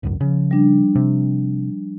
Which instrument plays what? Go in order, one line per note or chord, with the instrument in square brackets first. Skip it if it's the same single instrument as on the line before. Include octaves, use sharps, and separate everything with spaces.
[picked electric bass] G#1 C#2 F#2
[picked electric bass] C#3 [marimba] F3
[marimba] G3 D4
[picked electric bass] C3